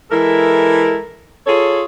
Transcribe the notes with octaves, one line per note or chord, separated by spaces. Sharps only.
E3 G#3 E4 A4 A#4
F4 G#4 A4 C#5